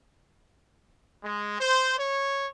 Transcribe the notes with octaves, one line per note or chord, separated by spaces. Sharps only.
G#3
C5
C#5